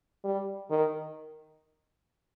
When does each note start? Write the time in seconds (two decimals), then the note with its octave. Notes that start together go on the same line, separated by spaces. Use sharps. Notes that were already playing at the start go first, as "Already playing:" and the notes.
0.24 G3
0.70 D#3